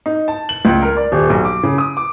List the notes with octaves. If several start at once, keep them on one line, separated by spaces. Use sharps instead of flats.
D#4
A5
F#7
C#2
A#4
D5
D#1
B1
D6
C#3
D#6
D6